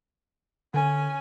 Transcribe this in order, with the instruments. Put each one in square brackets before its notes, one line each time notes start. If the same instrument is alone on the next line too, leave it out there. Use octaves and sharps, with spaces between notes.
[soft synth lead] D3 [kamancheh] C#4 G#5